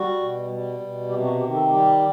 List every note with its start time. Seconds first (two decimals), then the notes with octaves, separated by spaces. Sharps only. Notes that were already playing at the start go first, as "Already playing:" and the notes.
Already playing: G3 F#4
0.20 B2
0.50 G3
0.80 B2
1.09 C3 G4
1.24 F#4
1.39 D#3 G4
1.54 A4
1.69 G3 G4